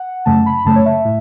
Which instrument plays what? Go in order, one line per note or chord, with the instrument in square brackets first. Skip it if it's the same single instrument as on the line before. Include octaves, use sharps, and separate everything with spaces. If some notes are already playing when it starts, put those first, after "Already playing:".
Already playing: [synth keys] F#5
F#2 C#3 A3 A5
B5
F#2 C#3 A3 A5
C#5
E5
A2